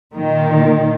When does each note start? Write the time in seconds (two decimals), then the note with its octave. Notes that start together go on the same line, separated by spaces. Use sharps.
0.15 A#2 D#3